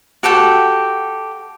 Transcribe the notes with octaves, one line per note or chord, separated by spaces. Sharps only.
F#4 G4 A4 G5